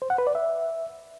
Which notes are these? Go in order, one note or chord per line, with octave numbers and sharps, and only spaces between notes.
C5
F#5
B4
D5
E5